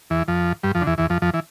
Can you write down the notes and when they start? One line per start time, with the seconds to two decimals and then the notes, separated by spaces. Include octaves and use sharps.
0.10 E2 E3
0.28 F2 F3
0.63 G2 G3
0.75 F2 F3
0.81 D3
0.87 E2 E3
0.98 E2 E3
1.10 F2 F3
1.22 F2 F3
1.34 E3